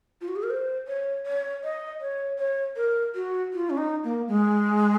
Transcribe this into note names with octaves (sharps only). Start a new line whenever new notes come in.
F4
F#4
G#4
A#4
C5
C#5
C#5
D#5
C#5
C#5
A#4
F#4
F4
C#4
D#4
A#3
G#3